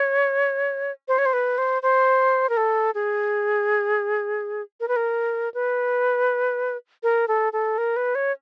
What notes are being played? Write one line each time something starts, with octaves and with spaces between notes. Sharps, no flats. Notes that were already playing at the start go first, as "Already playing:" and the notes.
Already playing: C#5
C5
C#5
C5
B4
C5
C5
A#4
A4
G#4
A#4
B4
A#4
B4
A#4
A4
A4
A#4
B4
C#5